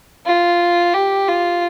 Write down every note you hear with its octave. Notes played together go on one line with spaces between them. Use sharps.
F4
G4
F4